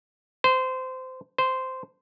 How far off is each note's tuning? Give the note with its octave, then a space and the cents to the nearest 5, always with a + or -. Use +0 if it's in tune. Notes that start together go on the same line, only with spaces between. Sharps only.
C5 -20
C5 -10